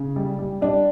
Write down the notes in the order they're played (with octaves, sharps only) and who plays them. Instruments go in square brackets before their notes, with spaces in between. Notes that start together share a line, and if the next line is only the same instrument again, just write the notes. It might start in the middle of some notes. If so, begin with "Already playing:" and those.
Already playing: [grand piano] C#3
G3
G3
[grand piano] G3 [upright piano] D4